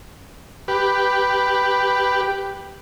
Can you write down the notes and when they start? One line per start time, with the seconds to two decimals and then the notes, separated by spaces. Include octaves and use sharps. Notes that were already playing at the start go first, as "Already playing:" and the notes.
0.68 G4 B4